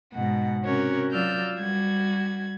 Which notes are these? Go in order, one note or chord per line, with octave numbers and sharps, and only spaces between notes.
G#2 B2 F#5
C3 C#4 F#4 A#4 C#5
F#3 F4 D5 E6 F6 G6
G3 F#4 G#6